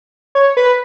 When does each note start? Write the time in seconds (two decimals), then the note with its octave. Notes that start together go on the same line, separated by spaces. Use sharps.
0.35 C#5
0.57 B4